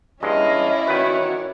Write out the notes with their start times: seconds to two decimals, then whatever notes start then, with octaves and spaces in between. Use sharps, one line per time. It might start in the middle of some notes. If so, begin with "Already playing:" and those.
0.23 G2 G#3 C#4 E4 D5 D#5 F5
0.87 D#3 F#4 B4 C#5